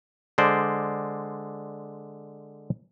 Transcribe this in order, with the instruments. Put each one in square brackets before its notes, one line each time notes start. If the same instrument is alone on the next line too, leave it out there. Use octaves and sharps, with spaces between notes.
[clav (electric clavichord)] D3 G#3 C5 D5